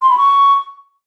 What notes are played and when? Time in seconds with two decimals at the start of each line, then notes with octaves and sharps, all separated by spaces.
0.02 C6
0.10 B5
0.17 C#6